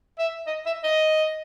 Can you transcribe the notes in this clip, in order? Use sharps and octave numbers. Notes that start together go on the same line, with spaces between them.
E5
D#5
E5
D#5